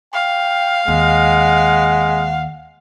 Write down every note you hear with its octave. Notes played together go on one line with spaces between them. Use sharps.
F5 G5
D#2 G#3 F#5